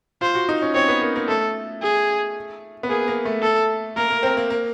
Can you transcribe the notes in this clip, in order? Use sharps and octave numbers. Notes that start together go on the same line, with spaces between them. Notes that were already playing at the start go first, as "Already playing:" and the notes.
F4 C5
F#4
D#4
C#4
C4 C#5
B3
A#3
A#3
A3 A4
G#4
B3
A#3 G#4
A#3
A3
A4
A#3 A#4
A#3
C4
A#3
A#3